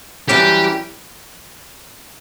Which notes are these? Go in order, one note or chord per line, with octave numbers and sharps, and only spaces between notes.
F#2 E3 G3 G4